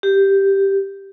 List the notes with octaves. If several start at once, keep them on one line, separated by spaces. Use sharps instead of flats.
G4